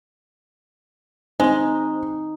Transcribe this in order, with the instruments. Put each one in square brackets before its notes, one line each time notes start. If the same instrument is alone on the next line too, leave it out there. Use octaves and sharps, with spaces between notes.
[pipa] G#3 [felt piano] C4 [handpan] D#4